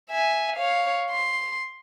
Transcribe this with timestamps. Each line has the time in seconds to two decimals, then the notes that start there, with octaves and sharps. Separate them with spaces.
0.10 E5 G#5
0.56 C#5 F5
1.10 C6